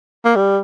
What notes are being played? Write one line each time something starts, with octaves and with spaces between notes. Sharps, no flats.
A#3
G3